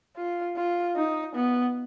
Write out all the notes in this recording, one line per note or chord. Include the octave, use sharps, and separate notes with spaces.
F4
F4
D#4
B3